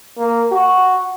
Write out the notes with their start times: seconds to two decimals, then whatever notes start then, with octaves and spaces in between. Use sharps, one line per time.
0.18 A#3
0.52 F#4